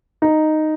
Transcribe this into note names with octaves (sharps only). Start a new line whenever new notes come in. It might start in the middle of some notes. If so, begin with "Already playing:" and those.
D#4